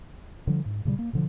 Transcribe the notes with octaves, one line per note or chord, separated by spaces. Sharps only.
D3 F3 G3
G#2
A#2 C#3 E3 G3
A#3
B2 D3 F3